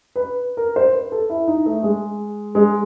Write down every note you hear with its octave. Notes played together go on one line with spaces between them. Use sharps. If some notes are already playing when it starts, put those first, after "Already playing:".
B4
A#4
C5
B4
A4
E4
D#4
A3
G#3
G#3